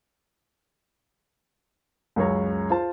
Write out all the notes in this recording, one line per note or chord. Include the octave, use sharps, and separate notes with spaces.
C#2 F#2 C#5 A#5
F4 C5 A5